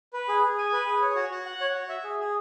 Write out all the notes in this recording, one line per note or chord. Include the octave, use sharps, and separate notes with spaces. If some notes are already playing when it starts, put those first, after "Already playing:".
B4
G#4
G#4
G#5
B4
G#4
C#5
F#4
F#4
F#5
C#5
F#4
E5
G#4
G#4